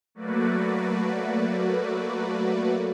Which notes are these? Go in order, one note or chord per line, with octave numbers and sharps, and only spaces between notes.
F#3 A3 A#3 F#4 B4 D5